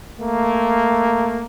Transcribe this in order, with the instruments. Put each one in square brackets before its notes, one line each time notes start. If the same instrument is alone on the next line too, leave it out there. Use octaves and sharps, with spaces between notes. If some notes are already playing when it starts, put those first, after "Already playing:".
[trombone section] A3 A#3